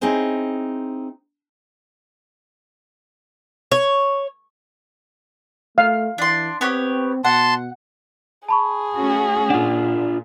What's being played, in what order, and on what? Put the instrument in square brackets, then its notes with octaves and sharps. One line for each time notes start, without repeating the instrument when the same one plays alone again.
[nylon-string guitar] C4 D#4 E4 G#4 C5 C#5
[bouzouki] C#5
[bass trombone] A3 [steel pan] F5
[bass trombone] E3 [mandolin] D4 C6
[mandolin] B3 G4 C#5 [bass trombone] C4
[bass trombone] B2 [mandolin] F#5 [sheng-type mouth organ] A5 C6
[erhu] G#4 [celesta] A5 B5 C#6
[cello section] A3 C#4 F#4
[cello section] A#2 [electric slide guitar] D4 F4 [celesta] F#5